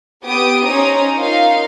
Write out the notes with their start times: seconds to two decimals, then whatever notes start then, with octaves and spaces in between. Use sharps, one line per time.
0.23 B3 G4 D#6 D7
0.64 C#4 D#4 C5 A#5 D#6
1.17 D#4 F4 A#4 F5